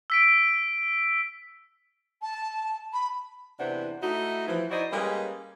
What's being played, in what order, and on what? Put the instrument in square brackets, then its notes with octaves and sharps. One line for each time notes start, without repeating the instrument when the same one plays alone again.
[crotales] E6 B6 D7
[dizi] A5
B5
[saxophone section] E2 C3 E3 D4 C5 F#5
A3 D#4 E4 F#4
E3 F3
D#4 E4 F#4 C5 D5 D#5
G3 G#3 A#3 C#4 G#4 B4